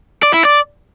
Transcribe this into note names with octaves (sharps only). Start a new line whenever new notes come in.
D5
E4
D5